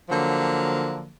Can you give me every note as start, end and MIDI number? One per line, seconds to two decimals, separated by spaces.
0.10 1.10 50
0.10 1.10 53
0.10 1.10 54
0.10 1.10 58